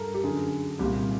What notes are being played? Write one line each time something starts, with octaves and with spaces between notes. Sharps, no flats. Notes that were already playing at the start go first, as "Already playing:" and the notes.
Already playing: G2 A4 A#4
G4
F#2 D3 G#4
C2 A#2 G4